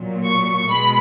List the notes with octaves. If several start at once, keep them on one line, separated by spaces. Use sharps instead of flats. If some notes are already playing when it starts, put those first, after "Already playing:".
Already playing: A#2 F#3
C#6
B2 G#3 B5